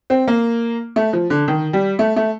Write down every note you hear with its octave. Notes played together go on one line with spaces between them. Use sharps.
C4
A#3
A3
F3
D3
D#3
G3
A3
A3